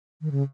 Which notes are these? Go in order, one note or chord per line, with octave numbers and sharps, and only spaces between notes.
D#3
C#3